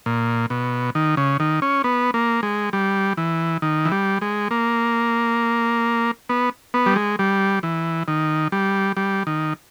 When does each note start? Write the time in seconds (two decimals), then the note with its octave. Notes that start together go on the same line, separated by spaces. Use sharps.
0.06 A#2
0.50 B2
0.95 D#3
1.17 C#3
1.40 D#3
1.62 C#4
1.84 B3
2.14 A#3
2.43 G#3
2.73 G3
3.17 E3
3.62 D#3
3.85 E3
3.92 G3
4.21 G#3
4.51 A#3
6.29 B3
6.74 B3
6.86 G3
6.96 G#3
7.19 G3
7.63 E3
8.08 D#3
8.52 G3
8.97 G3
9.27 D#3